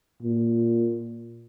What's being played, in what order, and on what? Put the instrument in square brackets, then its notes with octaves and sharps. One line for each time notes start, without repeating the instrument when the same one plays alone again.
[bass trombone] A#2